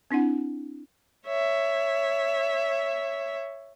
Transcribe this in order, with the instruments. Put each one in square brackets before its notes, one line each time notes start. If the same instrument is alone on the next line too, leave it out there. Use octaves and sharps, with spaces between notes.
[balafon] C4 D4 E4 F#5
[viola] C#5 E5